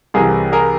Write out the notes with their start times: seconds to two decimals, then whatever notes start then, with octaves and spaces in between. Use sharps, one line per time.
0.14 C2 C3 E3 G#4 A#4
0.52 G#4 A#4